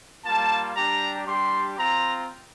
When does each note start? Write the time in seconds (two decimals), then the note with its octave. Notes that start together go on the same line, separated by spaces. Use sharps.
0.24 G3 A#3 F4 A5
0.76 G3 D4 G4 A#5
1.27 G3 D4 G4 C6
1.78 C4 F4 A#5